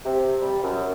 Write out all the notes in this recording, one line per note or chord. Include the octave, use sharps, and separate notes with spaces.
C3
G3
F#2